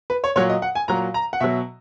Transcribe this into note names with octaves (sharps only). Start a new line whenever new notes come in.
B4
C#5
A#2 F#3 C#5
D#5
F#5
G#5
A#2 F#3 A#5
A#5
F#5
B2 F#3 E5